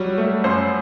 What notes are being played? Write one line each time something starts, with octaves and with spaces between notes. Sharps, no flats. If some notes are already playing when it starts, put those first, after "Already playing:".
Already playing: F#3 G3
A3
F#2 C5